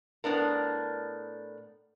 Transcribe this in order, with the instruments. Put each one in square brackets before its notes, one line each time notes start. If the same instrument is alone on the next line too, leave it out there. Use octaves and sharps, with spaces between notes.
[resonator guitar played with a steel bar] A2 B3 D4 A#4